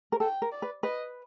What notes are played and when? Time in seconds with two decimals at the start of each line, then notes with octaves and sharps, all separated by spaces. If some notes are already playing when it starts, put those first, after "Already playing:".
0.12 A#4
0.20 A4 G5
0.42 A#4
0.52 D5
0.62 B4
0.83 B4 D#5